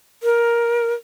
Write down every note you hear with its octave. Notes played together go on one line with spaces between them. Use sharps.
A#4